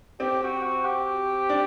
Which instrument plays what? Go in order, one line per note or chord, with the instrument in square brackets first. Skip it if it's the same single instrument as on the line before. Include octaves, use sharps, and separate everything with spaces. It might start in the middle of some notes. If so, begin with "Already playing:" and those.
[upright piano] C4 [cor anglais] G4
[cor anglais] F#4
F#4
G4
[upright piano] D4